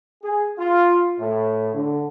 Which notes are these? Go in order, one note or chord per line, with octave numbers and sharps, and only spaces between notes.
G#4
F4
A2
D3